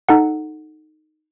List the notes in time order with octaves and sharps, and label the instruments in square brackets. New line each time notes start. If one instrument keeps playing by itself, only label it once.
[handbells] D#4 A4 F#5